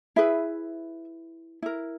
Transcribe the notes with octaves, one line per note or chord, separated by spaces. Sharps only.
E4 G#4 B4 E5
E4 A#4